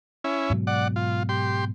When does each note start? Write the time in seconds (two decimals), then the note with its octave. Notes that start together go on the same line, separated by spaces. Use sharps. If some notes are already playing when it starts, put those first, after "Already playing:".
0.24 C#4 E4
0.50 G#2 B2 F#3
0.67 D5 F#5
0.96 F4
1.29 G4 C6